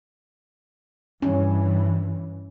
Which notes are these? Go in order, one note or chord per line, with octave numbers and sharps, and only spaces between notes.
G2 E3 C#4